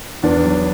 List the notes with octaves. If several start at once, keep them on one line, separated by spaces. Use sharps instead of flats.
E2 B3 D4
F#3